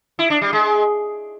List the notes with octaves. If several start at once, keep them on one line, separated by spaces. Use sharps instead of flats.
E4
D4
G3
G#3